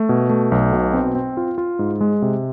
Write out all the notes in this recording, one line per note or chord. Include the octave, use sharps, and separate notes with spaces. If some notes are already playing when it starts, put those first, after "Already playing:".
Already playing: A3
B2
A3
B1
B2
C4
C4
F4
F4
G#2
G#3
C3